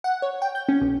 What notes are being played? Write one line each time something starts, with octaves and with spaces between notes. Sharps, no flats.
F#5
C#5
G5
G6
C#4
B1